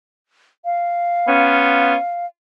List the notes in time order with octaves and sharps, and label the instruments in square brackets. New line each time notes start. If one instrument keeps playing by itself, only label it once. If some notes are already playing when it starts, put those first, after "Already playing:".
[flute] F5
[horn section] B3 C#4 F4